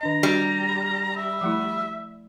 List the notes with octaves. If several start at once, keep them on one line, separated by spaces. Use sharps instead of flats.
D#3 D4 D#5 A#5
G3 D4 F#4 G4
B5
E5
F3 A3 E4